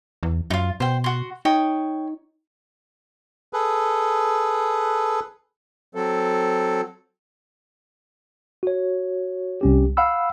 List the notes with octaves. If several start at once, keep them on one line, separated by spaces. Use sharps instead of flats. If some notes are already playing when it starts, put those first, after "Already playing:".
E2
F#2 D#4 F4
B2 C5 G5
F#4 C6
D#4 C#5 G5 D#6
G#4 A4 B4
F#3 C4 A4
F#4 C#5
C2 C#4 G4
F5 F#5 B5 E6